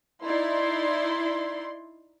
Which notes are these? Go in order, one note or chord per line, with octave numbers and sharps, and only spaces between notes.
D#4 E4 D5 C6